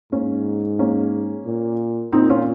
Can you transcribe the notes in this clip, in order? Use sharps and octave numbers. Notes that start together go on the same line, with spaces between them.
G#2 A#3 C#4
A#3 C#4
A#2
A#2 C4 D#4
C#4 F4